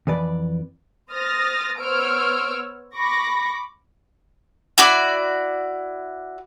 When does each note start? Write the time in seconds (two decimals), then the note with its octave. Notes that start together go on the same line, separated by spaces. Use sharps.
0.07 F2 E3 B4 D5
1.12 C5 D#6 F6 A6 A#6
1.79 B3 C5 C#5 E6 F6 D7
2.96 B5 C#6 D6 A#6
4.78 E4 F#4 D5